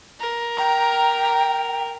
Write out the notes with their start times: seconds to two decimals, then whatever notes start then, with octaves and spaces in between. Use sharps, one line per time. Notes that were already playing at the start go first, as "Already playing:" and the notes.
0.20 A#4
0.58 G5 A#5